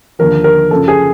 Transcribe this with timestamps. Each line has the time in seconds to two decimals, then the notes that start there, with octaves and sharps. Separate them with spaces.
0.19 D#2 D3 F3 A#4
0.44 A#4
0.71 F#2 C#3 F3 A4
0.88 G#4